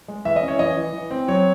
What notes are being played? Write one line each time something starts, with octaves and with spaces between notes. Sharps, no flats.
G#3
E3 E5
D#5
C#4
C#5
E3 D#5
E3
E3
C4
F#3 C#5